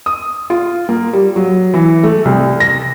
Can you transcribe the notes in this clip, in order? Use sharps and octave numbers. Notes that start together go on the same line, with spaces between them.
D#6
F4
A#3
G3
F#3
E3
A3
C2
A#6